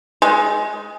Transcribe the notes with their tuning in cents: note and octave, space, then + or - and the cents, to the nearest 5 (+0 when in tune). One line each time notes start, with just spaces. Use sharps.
G#3 +15